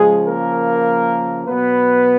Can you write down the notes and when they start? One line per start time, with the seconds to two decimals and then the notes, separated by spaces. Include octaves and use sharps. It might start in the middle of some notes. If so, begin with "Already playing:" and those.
Already playing: C#3 F3 G#3 G#4
0.26 A#3 A#4
1.48 B2 F#3 B3 B4